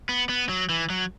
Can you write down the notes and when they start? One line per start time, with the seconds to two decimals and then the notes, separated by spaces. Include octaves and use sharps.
0.09 B3
0.29 B3
0.49 F#3
0.69 E3
0.90 F#3